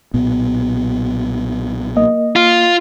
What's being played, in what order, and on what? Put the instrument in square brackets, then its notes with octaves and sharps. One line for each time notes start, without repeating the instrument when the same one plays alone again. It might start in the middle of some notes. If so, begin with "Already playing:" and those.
[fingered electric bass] B1 A#2 B3
[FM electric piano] A#3 D#5
[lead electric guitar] F4